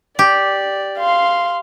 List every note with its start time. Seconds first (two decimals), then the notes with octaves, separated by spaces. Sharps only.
0.19 G4 D5
0.98 F5 C6